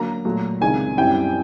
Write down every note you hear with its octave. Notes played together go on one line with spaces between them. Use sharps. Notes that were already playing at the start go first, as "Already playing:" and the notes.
Already playing: D3 F#3 A#3 A#5
A#2 F#3 A3
C#2 C3 D#3 G#3 G#5
F#2 D3 G3 C4 E4 G5